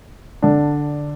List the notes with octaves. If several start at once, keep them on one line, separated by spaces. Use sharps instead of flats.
D3 D4